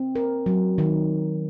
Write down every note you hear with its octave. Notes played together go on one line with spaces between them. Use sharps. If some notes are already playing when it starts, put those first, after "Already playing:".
Already playing: C4
A#4
F#3
D#3